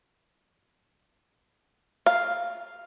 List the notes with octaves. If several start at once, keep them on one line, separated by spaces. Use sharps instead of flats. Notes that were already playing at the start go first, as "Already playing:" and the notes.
F5